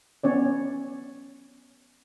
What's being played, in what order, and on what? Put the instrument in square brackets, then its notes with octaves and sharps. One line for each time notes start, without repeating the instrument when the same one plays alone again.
[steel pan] B3 C#4 C#5 D5